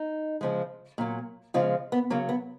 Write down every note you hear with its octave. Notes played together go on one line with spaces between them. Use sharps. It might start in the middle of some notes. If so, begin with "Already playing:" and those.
Already playing: D#4
C#3 F3 G#3
A#2 F#3
C#3 F3 G#3 F4
B3
C#3 F#3 A#3
B3